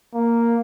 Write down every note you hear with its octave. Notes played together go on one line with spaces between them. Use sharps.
A#3